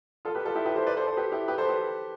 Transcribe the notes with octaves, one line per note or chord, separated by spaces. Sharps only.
F4 A4
G4 B4
F4 A4
E4 G4
G4 B4
A4 C5
B4 D5
A4 C5
A4 C5
G4 B4
E4 G4
G4 B4
A4 C5
G4 B4